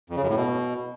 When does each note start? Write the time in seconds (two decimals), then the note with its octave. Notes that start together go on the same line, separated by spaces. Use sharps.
0.10 F2
0.16 C#3
0.23 F#2
0.29 A2
0.36 B2